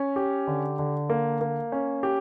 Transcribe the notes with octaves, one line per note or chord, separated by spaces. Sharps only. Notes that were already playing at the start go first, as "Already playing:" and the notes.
Already playing: C#4
G4
D3
D3
A#3
A#3
C#4
G4